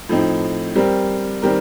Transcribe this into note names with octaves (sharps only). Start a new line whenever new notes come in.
A2 F3 C4 D#4
G3 C4 G4 A#4
D#3 G3 C4 G4 A#4